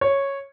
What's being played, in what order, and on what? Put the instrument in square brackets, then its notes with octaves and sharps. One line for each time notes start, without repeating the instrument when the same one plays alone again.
[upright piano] C#5